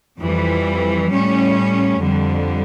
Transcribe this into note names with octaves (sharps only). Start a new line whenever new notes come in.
F2 E3 G3
A2 G3 C#4
F2 D3 G3